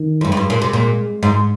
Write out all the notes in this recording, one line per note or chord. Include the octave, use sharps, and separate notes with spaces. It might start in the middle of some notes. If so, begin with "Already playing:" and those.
Already playing: D#3
F2
G2 G#3
F2
G2
A#2
C3
A#2
G#2